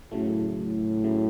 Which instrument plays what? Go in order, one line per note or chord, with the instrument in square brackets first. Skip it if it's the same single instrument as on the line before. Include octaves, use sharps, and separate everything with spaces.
[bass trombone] A2 [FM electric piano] C#3 F#3 A3
[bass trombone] A2
[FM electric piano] C#3 F#3 A3